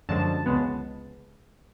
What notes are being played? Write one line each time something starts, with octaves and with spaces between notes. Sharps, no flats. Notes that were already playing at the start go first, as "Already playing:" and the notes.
F#2 D3 F3 G#3 A5
C#2 C#3 G#3 B3